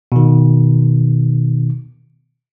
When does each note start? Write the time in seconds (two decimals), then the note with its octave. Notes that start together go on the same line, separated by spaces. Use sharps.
0.12 B2 D#3